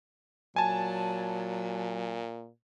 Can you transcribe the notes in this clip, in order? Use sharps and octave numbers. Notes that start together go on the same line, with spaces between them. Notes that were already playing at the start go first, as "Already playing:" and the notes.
A#2 F#3 G#5 A5